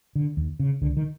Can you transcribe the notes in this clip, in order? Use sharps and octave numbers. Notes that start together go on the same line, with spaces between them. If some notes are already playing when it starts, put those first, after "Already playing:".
D3
D#2
C#3
C#2 D3
D#3